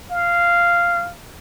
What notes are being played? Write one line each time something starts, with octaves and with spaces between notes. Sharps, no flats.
F5